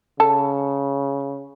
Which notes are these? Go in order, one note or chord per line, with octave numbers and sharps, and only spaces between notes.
C#3 A4